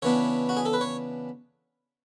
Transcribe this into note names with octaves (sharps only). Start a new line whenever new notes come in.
C#3 E3 B3 D4 C#5
F#4
G#4
A4
B4
C#5